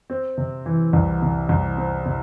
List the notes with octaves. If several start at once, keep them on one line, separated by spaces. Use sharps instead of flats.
C4
C3
E3
C2
C3
C2
C4
C3